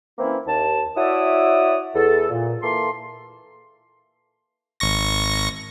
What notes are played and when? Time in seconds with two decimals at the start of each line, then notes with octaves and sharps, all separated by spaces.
0.19 E3 A#3 C4 C#4 E4
0.47 D#2 A5
0.97 E4 F#4 C#5 D5 E5 D#6
1.95 E2 A4
2.31 A#2
2.63 E3 A#3 A4 C6
4.80 G#1 C#6 A#6